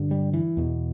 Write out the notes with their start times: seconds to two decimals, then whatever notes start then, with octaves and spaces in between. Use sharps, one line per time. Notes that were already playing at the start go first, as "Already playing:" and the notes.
Already playing: G2 D3
0.11 G3
0.33 E3
0.57 E2 B2